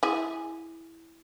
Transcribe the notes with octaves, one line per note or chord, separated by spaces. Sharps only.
E4 G#4